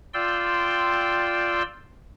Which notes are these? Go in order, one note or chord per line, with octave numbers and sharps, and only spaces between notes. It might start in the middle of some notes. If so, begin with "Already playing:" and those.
F4 D5 G5 C6 E6